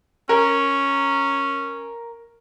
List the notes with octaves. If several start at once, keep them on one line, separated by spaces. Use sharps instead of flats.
C#4 A#4